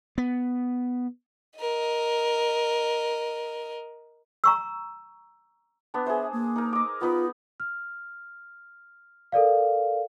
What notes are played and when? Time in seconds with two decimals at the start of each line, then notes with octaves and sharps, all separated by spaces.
0.18 B3
1.59 A#4 D#5
4.44 A#5 C#6 E6
5.94 B3 D4
6.06 G#4 C5 E5
6.33 A#3
6.56 D#4 A#4
6.73 D#5 D6
7.01 B3 D#4 F4 B5
7.60 F6
9.32 A4 A#4 D5 F5